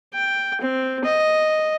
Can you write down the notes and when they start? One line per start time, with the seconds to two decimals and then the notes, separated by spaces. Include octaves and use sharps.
0.14 G5
0.61 C4
1.04 D#5